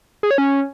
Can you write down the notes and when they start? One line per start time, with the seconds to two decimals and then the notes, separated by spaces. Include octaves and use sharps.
0.23 G#4
0.31 C#5
0.38 C#4